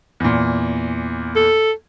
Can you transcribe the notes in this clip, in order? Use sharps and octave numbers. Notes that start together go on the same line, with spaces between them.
E2 A#2
A4